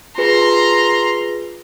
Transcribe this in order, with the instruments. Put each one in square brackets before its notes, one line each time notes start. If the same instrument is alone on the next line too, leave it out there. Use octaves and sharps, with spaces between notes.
[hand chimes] F4 G#4 B4 [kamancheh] A#5 C6